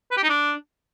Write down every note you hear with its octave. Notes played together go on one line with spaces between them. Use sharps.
B4
G4
D#4
D4